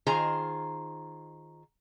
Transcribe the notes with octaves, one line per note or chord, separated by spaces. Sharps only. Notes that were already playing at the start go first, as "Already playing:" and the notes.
D#3 F4 G#4 C5 A#5